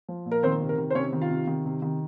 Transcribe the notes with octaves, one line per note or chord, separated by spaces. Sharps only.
F3
A#2
A#4
D#3 C4 C5
C3
A#4
D#3
C5
C3 C#4 C#5
D#3
F4 F5
C3
D#3
C3
D#3